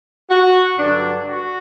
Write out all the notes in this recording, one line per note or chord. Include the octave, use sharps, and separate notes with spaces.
F#4
G2 D3 F#3 D4
F#4